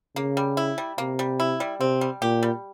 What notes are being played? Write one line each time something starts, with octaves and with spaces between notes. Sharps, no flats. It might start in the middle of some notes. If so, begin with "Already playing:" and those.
C#3 A#3
G3
E4
G3
C3 A#3
G3
E4
G3
C3 C4
G3
A#2 G4
G3